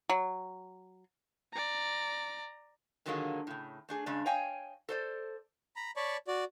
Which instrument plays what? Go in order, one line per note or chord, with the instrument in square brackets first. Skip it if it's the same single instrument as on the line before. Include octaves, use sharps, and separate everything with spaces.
[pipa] F#3
[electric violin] D5 A#5
[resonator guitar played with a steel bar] A#2 D3 D#3 F#3 G#3 A#3
A2 C#3
A3 D4 G#4
G2 C#3 G#3 D4
C#5 D#5 F5 G5 G#5
A4 C5 D5
[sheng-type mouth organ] A#5 B5
C#5 D5 A5 B5 C#6
F#4 D5